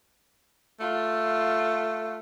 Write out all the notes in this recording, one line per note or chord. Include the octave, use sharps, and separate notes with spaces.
A3 F4